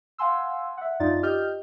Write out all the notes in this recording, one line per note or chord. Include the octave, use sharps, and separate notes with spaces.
F5 F#5 G#5 C6 E6
E5 F#5
F#2 D4 D#4 F4 D5 A6
G4 D#5 F6 G6